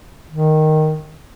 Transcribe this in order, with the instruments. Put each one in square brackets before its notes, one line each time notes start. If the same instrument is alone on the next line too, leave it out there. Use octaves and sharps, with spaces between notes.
[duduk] D#3